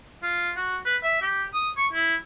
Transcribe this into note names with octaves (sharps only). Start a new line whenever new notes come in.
F4
F#4
B4
E5
G4
D#6
C#6
E4